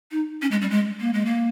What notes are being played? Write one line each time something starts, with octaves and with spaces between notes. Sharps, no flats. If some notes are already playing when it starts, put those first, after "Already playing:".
D#4
C#4
G#3
G3
G#3
A#3
G#3
A#3